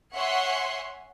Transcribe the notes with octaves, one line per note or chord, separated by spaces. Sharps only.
C#5 E5 F#5 G#5 C6